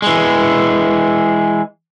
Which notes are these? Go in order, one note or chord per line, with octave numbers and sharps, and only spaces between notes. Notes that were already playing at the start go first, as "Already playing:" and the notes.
E3 G#3